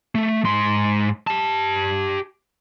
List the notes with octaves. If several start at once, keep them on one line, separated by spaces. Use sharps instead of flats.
A3
G#2 C6
G4 A5